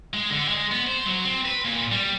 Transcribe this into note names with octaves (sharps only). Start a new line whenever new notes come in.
G#3
D3
G#3
B3
C5
F#3
C4
B4
A#2
G3